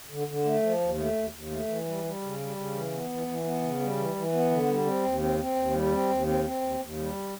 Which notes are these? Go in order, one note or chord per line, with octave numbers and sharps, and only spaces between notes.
D3
D3
A3
F3
D#2
A3
D#2
D#2
A3
E3
G3
G3
C#3
G3
C#3
E3
B3
E3
E3
B3
C#3
G3
E3
E3
B3
D3
G3
C4
D#2
C4
C4
D#2
G3
C4
D#2
C4
C4
D#2
D#2
G3